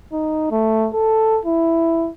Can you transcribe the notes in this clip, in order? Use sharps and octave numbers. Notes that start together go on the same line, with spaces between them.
D#4
A3
A4
E4